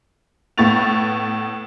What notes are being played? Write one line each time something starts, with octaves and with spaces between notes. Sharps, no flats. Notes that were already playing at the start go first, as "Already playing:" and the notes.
A2 B3 C#6 A6 F7